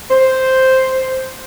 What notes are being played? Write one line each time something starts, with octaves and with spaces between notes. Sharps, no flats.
C5